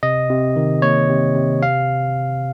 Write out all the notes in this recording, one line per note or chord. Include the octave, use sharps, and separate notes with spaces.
C3 D#5
C3
D#3
A#3 C#5
C3
C3
C4 F5